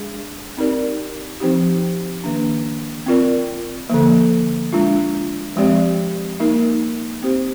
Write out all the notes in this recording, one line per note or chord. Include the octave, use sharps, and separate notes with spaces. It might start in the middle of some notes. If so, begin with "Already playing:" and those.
Already playing: G#3 D4 G#4
C4 D#4 G4 A#4 D5
F3 C4 D#4 G4
D#3 A#3 D4
C4 F4 A#4 D5
D3 F3 A#3
G#3 D4 F4
F3 G#3 C4 G4 D5
A#3 D#4 A#4
C4 G4 C5